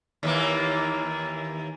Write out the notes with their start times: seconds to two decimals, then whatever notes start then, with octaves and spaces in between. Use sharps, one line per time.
0.23 D#2 E3 A#3